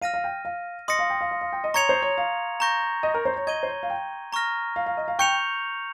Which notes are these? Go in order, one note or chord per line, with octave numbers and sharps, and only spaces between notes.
F5 F6 A#6 D#7
F5
G5
F5
D#5 C6 D#6 A#6 C#7
F5
G5
F5
F5
F5
G5
D#5
C#5 A#5 C#6 G#6 C#7 F7
C5
C#5
F5
A#5 C#6 G6 A#6
D#5
A#4
C5
C#5
D#5 C#6 G#6 D#7 G7
C5
C#5
F5
G5
A#5 C#6 F6 A#6
F5
F5
D#5
F5
G5 C#6 G6 C#7 F7